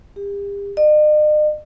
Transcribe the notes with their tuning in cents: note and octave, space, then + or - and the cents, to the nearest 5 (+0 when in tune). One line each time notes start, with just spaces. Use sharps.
G4 +40
D#5 -45